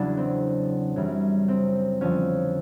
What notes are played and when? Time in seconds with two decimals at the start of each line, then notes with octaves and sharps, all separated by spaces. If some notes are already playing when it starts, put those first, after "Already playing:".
Already playing: E2 C#3 F#3 D4
0.17 C4
0.96 F#2 C#3 E3 G3
1.48 C4
2.01 F2 D3 F3 C#4